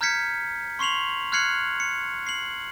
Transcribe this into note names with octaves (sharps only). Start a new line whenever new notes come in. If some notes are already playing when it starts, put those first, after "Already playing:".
A#5 F6 G6 G#6 B6 C#7
C6 C#6 C7 F7 F#7
F6 F#6 G#6 C7 C#7 F#7
C#7
C7 F#7